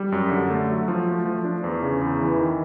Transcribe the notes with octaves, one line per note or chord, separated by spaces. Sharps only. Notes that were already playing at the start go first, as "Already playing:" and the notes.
Already playing: G3
F#2
D3
A3
F#3
F3
A3
F3
D4
E2
C#3
E2
E3
D#3